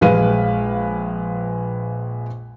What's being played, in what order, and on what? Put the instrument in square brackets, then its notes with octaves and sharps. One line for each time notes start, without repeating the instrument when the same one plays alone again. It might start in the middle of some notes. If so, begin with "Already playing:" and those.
[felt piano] A#1 G#3 B4 F5 D#7